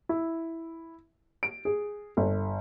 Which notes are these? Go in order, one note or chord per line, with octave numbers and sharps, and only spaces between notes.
E4
D7
G#4
G1